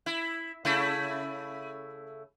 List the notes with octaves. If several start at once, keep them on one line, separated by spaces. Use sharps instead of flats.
E4
C#3 A3 E4